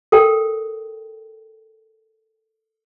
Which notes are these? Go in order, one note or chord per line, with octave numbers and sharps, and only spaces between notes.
A4 A#4 G5